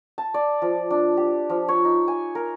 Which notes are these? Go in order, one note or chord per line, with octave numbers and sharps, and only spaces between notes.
A5
D5
F3
D4
G4
F3
C#5
D#4
G#5
A#4